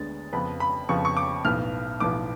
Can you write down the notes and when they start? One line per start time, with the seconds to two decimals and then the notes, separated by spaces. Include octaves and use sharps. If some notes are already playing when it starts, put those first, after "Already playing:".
Already playing: D2 D3 G#3 B3 A6
0.33 F2 C#3 F3 B3 B5
0.60 B5
0.89 F2 C#3 F3 B3 C#6
1.05 C#6
1.17 D6
1.45 B1 A2 F3 B3 F6
2.00 B1 A2 F3 B3 D6